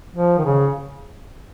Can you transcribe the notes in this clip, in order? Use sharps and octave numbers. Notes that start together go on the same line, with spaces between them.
F3
D#3
C#3